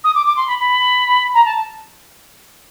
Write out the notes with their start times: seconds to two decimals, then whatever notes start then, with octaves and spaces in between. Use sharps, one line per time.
0.04 D#6
0.15 D6
0.26 D6
0.37 C6
0.47 B5
0.58 B5
1.34 A#5
1.45 A5